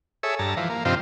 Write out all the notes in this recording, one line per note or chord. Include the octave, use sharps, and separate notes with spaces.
G#4 A4 C#5 E5
G2 A5 A#5
E3 F3
A#3
G2 C3 D#3 F3 C4 F4